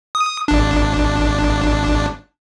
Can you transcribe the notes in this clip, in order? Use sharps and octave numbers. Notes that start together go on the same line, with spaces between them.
D#6
G#1 D4